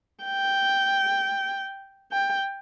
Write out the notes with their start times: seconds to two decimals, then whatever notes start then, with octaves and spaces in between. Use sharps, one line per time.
0.24 G5
2.12 G5